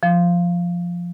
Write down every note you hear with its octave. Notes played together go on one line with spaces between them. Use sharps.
F3